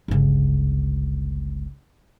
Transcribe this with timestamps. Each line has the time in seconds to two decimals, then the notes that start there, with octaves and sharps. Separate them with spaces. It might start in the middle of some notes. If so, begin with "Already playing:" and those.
0.08 G1 C#2